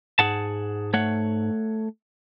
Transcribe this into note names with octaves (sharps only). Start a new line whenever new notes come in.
G#2 G#4 F#5 A5
A3 C#5 F#5